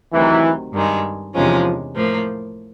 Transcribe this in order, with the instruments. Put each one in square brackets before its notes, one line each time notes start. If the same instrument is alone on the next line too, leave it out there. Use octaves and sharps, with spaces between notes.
[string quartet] D2 C3 D#3 F#3 [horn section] E3
[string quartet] G2 D#3 G#3
[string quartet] E2 C3 D#3 G#3 C#4 [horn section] F3
[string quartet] A2 F3 A#3